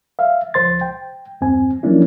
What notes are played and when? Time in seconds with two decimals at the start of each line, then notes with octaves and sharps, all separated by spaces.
0.19 E5 F5
0.54 C#2 F3 C5 C6 A6
0.81 G5
1.41 E2 G2 C4 G#5
1.83 F3 F#3 A#3 C#4 D4 E4